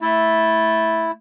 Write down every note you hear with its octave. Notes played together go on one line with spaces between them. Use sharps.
A3 E4